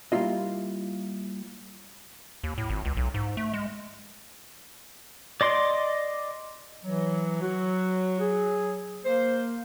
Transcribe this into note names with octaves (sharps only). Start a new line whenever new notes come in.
G3 A#3 E4 F4 D#5
D#2
A2
G#1
C#2
B1
G#2
A3
G#3
D5 D#5 C6 D6
E3 F#3
F#4
G#4
A#3 C5